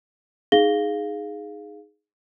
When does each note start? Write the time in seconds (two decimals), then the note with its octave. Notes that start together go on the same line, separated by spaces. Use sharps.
0.52 D#4 G#4 F5 A#6 G7